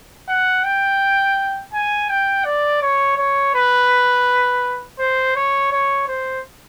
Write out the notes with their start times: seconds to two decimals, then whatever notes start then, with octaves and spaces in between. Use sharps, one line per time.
0.28 F#5
0.64 G5
1.73 G#5
2.09 G5
2.45 D5
2.82 C#5
3.18 C#5
3.55 B4
4.99 C5
5.36 C#5
5.72 C#5
6.08 C5